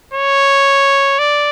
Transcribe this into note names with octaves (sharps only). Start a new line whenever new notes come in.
C#5
D5